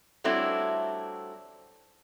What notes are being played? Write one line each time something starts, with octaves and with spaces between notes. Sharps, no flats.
F#3 G3 A3 C4 D4 E4